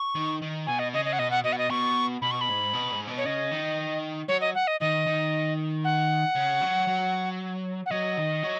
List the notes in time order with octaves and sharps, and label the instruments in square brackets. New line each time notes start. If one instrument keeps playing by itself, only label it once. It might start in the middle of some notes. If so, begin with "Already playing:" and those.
Already playing: [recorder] C#6
[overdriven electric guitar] D#3
D#3
[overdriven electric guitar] B2 [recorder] G#5
[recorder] D#5
[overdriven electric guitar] C#3 [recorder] D#5
[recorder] D#5
F#5
[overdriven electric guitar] B2 [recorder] D#5
[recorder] F#5
[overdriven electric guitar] B2 [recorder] D#5
[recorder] F#5
D#5
[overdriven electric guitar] B2 [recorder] C#6
[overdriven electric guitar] B2 [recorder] B5
[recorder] C#6
B5
[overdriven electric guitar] G#2
B2
G#2
B2
[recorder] C#5
[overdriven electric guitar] C#3 [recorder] D#5
[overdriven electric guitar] D#3
[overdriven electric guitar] F#3 [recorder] C#5
[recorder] D#5
F#5
D#5
[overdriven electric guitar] D#3 [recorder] D#5
[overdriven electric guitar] D#3
[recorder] F#5
[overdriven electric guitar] C#3
F#3
F#3
[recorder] F#5
[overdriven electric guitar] F#3 [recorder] D#5
[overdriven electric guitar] D#3
F#3